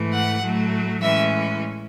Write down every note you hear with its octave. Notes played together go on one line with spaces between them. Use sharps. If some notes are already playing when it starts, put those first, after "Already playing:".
Already playing: G#2 E3 A3
F#5
A2 F#3 A3
A2 E3 G#3 C#4 E5